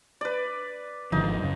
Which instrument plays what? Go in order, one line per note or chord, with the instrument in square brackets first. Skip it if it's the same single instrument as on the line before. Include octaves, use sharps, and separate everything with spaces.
[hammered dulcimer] B4 D5
[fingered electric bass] G#1 D3 F3 [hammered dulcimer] D#4
[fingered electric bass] F#2 C#3